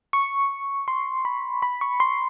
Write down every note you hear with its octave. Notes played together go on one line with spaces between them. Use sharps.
C#6
C6
B5
B5
C#6
C6